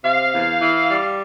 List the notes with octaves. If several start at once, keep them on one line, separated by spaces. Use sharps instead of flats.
C3 F5
E2
E3
G3